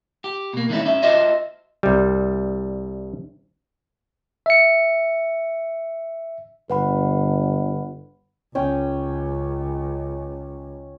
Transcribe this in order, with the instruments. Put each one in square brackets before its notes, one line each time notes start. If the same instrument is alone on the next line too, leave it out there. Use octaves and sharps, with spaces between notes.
[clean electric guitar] G4
B2 A#3
D#3 G#3 A3 C4 C#4 E4
C#4 E5
F4 F#4 C5 D#5 E5
[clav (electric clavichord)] C2 G3
[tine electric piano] E5 C#7
[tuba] G1 [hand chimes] B4 F#5 B5
[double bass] C#2 [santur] C#4 G5 D#6